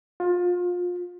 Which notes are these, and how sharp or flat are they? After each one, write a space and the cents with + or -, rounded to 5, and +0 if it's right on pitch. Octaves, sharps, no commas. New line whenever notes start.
F4 +25